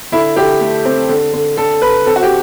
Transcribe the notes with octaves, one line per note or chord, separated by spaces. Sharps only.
D3 E4
D3 G4
A3
C4
D3
D3
D3 A4
D3 B4
C4 A4
F#4
G4